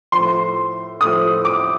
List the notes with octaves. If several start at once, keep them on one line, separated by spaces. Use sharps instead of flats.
A2 F3 C6
A2 F3 D#6
D6